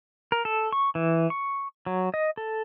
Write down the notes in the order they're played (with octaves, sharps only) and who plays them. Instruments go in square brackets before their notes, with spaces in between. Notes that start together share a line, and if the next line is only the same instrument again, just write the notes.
[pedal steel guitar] A#4
A4
C#6
E3
C#6
F#3
D#5
A4